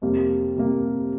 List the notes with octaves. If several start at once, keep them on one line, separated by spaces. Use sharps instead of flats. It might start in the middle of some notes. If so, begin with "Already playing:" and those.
F2 C3 G3 A#3
C3 G3 A#3